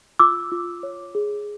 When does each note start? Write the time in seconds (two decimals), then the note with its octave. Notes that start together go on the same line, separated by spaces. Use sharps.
0.19 F4 D6 E6
0.52 F4
0.83 C#5
1.15 G#4